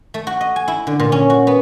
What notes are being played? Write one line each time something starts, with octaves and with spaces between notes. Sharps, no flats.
A3
F#4
D#5
G#5
E4
D3
A#2
C#4
F#4
B3